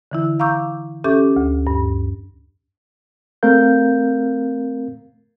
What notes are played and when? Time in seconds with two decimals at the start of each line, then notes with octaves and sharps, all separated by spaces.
0.11 D3 E3 E4
0.40 F5 A#5 C#6 D6 E6 G6
1.04 C#4 G4 A4 E5 D6 G6
1.36 D2
1.67 G2
3.43 A3 C4 A#4 F5 G6